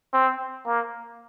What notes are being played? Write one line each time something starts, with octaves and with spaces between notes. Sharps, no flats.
C4
A#3